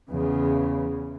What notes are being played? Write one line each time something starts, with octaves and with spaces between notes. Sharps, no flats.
E2 C#3